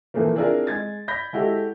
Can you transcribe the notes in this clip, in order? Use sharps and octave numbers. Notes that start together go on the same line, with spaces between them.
A#2 E3 F3 A3 A#3
C4 D4 E4 F4 G#4 A#4
G#3 G#6 A6
B5 G6 A#6 B6
G#3 E4 F#4 G4 A4